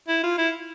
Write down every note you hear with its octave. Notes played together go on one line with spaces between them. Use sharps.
E4
F4
E4